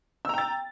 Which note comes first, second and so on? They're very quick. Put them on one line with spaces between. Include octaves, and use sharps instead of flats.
E6 A#5 G5 A6